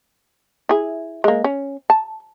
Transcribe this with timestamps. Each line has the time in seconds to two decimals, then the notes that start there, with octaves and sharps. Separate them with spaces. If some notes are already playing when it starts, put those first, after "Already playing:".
0.69 E4 G#4
1.24 G#3 A#3
1.44 C#4
1.90 A5